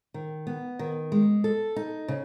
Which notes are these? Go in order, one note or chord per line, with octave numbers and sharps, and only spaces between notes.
D#3
B3
D#3
G#3
A4
D#4
C#3